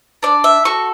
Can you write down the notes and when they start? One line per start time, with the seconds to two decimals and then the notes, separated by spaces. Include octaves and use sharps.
0.23 D4 D5
0.44 E5
0.65 F#4 A4 C#6